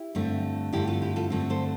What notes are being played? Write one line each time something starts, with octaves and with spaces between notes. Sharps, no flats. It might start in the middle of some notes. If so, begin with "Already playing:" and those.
Already playing: E4 G4
G2 D3 A3 C4
G2 D3 A3 C4 E4 G4
F4 A4
E4 G4
F4 A4
G2 D3 A3 C4
A4 C5